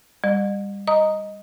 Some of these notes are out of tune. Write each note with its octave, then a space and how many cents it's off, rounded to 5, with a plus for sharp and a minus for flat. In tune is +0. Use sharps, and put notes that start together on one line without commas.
G3 +25 D#5 -45
D#5 +0 A#5 +0 D#6 +0